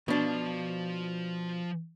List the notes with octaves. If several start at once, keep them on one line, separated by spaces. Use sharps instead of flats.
B2 F3 D4 F5